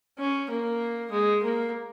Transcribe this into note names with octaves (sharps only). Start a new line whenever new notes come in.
C#4
A#3
G#3
A#3